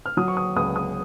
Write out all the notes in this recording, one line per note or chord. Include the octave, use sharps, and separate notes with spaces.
F6
F#3 D#6
C#6
D#6
C#2 D#6
D#6